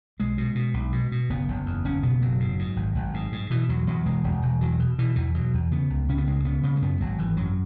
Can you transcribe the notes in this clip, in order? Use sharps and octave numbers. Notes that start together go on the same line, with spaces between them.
B1 G#3
B2
B2
B1
B2
B2
F#1 B3
F#1
E2
F#1 C#4
B2 B3
F#1 F#3
G#2
G#2
G#1
G#1
G#2
G#2
B2 E3
E2 F#3
E2 F#3
E1 G#3
E1
E1
E2 F#3
B2
B2 E3
E2 E3
B2 F#3
E2
C#3 B3
C#2
C#3 C#4
B3
C#2 G#3
C#3 B3
C#3 B3
G#3
F#2 B3
G#1 F#3
G#1 E3
F#2 F#3